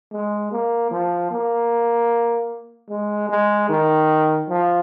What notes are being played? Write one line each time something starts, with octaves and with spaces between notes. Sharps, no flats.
G#3
A#3
F3
A#3
G#3
G#3
D#3
F3